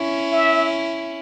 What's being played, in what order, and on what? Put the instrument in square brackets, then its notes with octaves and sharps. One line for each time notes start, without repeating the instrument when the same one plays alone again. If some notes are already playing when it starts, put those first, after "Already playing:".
Already playing: [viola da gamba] C#4 E4
[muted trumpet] E5